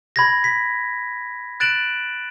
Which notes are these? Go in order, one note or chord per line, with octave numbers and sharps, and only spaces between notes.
B5 G#6 A#6
B6
F#6 A6 D7 E7 F#7